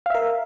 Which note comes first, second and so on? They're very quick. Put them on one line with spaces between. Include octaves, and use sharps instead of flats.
F5 E5 A#4